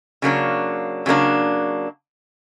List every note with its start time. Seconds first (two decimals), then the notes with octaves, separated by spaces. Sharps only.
0.22 C#3 F#3 A#3 D4
1.06 C#3 F#3 A#3 D4